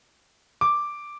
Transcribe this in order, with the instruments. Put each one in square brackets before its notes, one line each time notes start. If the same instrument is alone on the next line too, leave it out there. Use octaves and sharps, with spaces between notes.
[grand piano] D6